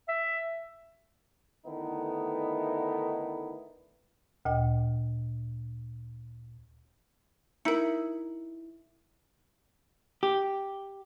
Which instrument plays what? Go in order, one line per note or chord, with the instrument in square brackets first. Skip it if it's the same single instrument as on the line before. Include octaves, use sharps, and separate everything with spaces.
[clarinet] E5
[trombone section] D3 D#3 A3 B3 D#4 E4
[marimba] D2 A#2 D#5 G5
[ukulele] D#4 E4 [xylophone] A#4 C#7
[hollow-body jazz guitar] G4